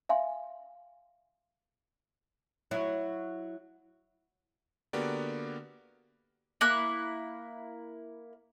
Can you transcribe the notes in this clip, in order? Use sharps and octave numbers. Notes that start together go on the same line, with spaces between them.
E5 F5 G#5 C6
F#3 E4
D3 A#3 B3 F#4 G4 D5
A#3 E4 F#6